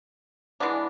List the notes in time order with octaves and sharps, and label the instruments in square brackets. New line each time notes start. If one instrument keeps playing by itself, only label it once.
[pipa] E3 G#3 B3 D4